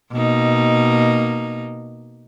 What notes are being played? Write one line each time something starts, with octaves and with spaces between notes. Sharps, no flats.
B2 A#3 D#4